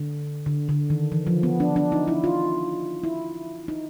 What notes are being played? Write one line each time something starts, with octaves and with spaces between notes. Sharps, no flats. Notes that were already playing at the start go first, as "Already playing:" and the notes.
Already playing: D3
D3
D3
D#3
E3
F3
B3
D4
D4
D#4
E4
F4
E4
D#4